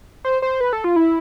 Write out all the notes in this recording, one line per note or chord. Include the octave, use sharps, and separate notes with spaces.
C5
C5
B4
A4
F4
E4